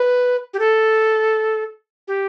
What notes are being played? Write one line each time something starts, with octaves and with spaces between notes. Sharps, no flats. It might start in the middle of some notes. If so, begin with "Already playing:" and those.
Already playing: B4
G4
A4
G4